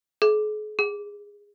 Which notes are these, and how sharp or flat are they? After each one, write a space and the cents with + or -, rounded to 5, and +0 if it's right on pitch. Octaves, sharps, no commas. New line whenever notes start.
G#4 +40
G#4 -15